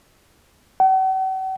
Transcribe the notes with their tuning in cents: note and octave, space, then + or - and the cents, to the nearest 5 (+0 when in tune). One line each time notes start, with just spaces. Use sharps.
F#5 +45